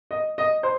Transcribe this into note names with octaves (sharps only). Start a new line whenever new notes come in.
D#5
D#5
C5